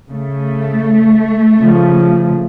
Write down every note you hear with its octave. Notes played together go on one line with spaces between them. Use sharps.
C#3 A3
C#3 F3